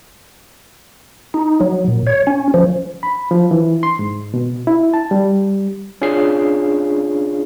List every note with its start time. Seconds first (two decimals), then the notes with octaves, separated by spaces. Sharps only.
1.34 D#4
1.61 F#3
1.88 A#2
2.07 C#5
2.27 C#4
2.54 F3
3.03 B5
3.31 F3
3.51 E3
3.83 C6
3.99 G#2
4.34 B2
4.67 E4
4.94 A5
5.11 G3
6.02 C#4 D4 F4 G#4 C7